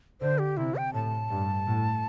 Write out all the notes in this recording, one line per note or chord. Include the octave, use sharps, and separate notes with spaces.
D3 C5
G4
C3 E4
G5
A2 A5
G2
A2